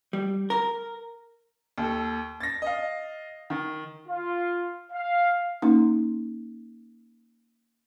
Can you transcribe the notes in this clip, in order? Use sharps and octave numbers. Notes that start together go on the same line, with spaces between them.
G3
A#4
D#2 A4
A6 A#6
D#5 F5
D#3
F4
F5
A#3 C#4 D#4